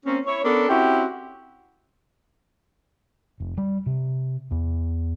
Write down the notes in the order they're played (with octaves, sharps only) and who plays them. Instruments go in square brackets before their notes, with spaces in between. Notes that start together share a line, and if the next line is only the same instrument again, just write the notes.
[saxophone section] A#3 C4 C#4
E4 C#5
B3 C#4 D4 A4 A#4
C4 C#4 E4 F#4 G4
[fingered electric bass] F1
G3
C3
E2